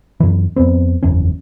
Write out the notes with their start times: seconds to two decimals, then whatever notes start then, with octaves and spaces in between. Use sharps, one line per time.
0.20 F#2 E3
0.56 F2 B3 C4
1.03 F#1 E2 C#4